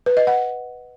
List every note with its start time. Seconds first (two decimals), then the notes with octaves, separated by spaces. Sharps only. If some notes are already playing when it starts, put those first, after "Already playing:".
0.06 B4
0.17 D#5
0.27 F#5